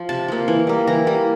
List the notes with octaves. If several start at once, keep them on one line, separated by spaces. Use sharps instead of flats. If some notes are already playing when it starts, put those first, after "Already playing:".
Already playing: F3
C3 A5
F3 A#3
E3
G3 A#3
E3 A#5
G3 A#3